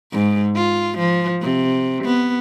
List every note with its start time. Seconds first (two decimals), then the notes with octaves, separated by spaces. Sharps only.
0.12 G#2
0.56 F4
0.98 F3
1.42 C3
2.05 B3